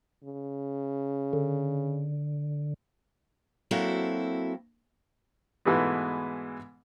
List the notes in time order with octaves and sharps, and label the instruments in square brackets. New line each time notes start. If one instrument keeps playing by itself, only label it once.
[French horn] C#3
[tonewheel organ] D3
[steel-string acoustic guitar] F#3 A#3 C4 E4 F#4 A4
[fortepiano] G#2 B2 E3 G#3 A3 B3